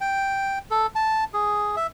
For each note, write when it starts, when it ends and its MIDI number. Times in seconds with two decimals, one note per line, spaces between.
0.01 0.59 79
0.71 0.87 69
0.95 1.24 81
1.34 1.76 68
1.77 1.87 76